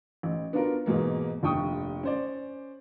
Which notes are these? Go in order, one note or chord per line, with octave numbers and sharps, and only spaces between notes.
A1
B3 D4 F4 F#4 A#4
G#2 B2 E3 A#3
F1 D#2 D4 G5 C#6 D#6
C#4 C5 D5